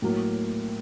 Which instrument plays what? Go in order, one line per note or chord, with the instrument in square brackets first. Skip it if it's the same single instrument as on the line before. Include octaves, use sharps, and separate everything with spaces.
[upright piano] A2 F#3 A#3